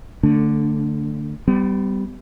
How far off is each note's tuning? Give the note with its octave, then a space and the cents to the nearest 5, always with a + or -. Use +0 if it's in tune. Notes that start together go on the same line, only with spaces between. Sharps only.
D3 +0 A3 +25 D4 +0
G3 -10 B3 +40